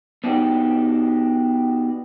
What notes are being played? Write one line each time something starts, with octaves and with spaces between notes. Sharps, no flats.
B3 D4 D#4 F#4 G4